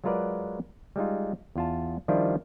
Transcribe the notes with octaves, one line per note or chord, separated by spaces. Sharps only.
F#3 G#3 F4 A#4 B4 D5
G3 G#3 D#4 F4
E2 F4 A5
D#3 F3 G3 D4 E4 F4